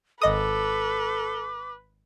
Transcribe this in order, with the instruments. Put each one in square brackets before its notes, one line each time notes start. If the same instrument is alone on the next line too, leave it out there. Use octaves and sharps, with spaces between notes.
[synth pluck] G#1 D#5 D#6 [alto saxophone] A4 [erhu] B4 [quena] D6